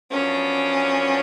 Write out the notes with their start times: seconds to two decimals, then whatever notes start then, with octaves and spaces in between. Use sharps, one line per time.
0.11 F#2 F3 B3 C#4 D4